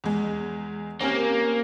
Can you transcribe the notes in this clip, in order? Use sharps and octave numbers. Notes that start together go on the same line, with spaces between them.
E2 G#3
A#3 C4 C#4 G4